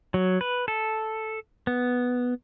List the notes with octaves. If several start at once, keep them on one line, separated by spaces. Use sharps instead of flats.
F#3
B4
A4
B3